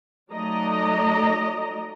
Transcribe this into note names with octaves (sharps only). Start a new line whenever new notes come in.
F#3 A3 D#4 D5 D#5 A#5